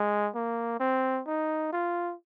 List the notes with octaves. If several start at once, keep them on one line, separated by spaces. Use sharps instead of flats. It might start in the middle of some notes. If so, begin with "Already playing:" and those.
Already playing: G#3
A#3
C4
D#4
F4